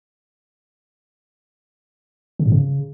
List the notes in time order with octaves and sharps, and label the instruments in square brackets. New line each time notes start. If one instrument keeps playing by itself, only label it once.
[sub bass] C#3
G#2
C#3